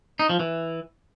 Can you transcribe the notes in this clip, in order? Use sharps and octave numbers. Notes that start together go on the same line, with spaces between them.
D#4
F3
E3